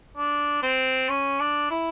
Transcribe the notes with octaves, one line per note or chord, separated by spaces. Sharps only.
D4
C4
C#4
D4
E4